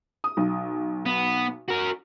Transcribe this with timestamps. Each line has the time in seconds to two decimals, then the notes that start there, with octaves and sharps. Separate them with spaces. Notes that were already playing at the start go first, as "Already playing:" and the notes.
0.24 D#6
0.37 B1
1.06 B3
1.68 F#4 A#4